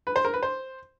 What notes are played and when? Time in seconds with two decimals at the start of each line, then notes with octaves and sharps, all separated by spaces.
0.07 B4
0.16 C5
0.25 A#4
0.34 B4
0.43 C5